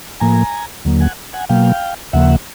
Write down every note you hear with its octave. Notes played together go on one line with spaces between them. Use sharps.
A2 F3 A#3 G#5 A#5
D#2 D3 F#3 A#3
F#5 G#5
F#5 G#5
B2 F#3 A#3 F5 G5
D#2 C#3 F3 A#3 E5 F#5